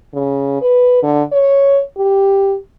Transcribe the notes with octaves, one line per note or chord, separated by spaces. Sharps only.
C#3
B4
D3
C#5
G4